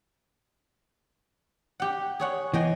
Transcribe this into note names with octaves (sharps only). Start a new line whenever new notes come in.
G4 F#5
G#4 C#5 F#5
E3 B3 G#4 D#5 G5